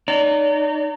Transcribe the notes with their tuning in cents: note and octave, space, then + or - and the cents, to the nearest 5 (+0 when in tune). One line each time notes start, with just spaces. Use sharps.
D#4 -30 D5 -40